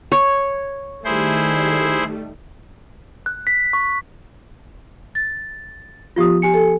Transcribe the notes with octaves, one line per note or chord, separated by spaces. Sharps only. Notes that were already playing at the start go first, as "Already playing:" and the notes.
C#5
D#3 G3 A3 E4 G#4 C5
F#6
B6
C#6
A6
F3 B3 F4 G4 D#6
G4 G#5 C#7
A4